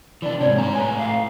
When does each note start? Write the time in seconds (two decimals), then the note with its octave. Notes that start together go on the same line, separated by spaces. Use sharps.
0.22 E3 D4 D5
0.41 G#2 C3 C#5
0.58 G#2 G#5 A#5
0.75 A2 B4 G#5
0.98 F5